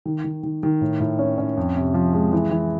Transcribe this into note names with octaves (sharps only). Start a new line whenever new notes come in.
D#3
D#3
D#3
D#3
A2
A2
C#4
C#4
F2
C3
F3
G#3
E3
E3